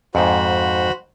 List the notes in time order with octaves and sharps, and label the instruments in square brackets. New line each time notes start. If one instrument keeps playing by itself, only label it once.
[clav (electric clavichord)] F2 G#2 [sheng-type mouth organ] F#4 C5 B5